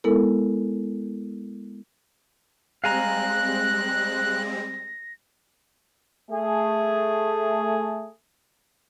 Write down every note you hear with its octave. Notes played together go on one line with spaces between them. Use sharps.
G#3 B3 E4 A4 A#4
G3 G#3 C4 F5 G#5 A#5 F#6 A#6
A3 G#4